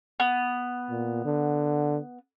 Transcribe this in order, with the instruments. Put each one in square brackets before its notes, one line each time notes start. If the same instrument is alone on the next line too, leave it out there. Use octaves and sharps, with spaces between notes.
[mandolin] B3
[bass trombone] A#2
D3